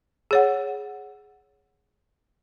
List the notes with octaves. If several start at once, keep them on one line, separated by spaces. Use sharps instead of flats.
G#4 C#5 F#5